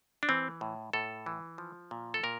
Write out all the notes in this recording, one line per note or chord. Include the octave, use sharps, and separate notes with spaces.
D4
E3 C4
A2
A2 A4
E3
F3
A#2
A4
A#2 A#4